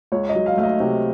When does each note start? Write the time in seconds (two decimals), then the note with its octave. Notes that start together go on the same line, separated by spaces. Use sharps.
0.12 C#2 C#5
0.29 D#5
0.35 F#3
0.46 F5
0.57 A3 F5
0.63 D#5
0.80 C3